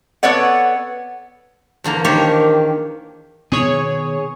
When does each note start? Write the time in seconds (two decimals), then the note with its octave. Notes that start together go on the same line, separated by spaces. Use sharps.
0.23 B3 A4 C#5 D5 F#5
1.84 E2 D3 A#3 A#5
2.04 D#3 A#3 D4 G4 C5 C#5
3.52 B2 D#3 B3 G#4 C#5